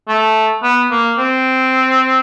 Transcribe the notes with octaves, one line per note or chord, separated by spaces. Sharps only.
A3
B3
A#3
C4